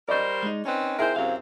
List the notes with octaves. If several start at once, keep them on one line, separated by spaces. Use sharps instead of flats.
G3 A#4 C5 D5 D#5 C#6
G#3 D#4
C4 C#4 D#4 B4
C4 E4 G#4 A#4 C5
F#2 C3 C4 F5